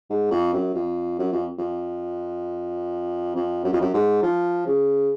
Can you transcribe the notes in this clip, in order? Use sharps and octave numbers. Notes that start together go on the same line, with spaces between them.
G#2
F2
F#2
F2
F#2
F2
F2
F2
F#2
F2
F#2
G#2
F3
C#3